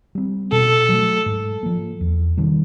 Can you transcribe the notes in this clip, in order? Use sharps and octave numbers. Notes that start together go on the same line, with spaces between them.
G3 C4
B2 A4
F#3 A3
G#2
F3 A#3
E2
C3 D#3 G3